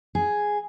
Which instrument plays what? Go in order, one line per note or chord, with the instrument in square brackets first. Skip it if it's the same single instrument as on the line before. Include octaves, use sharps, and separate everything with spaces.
[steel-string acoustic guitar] G#4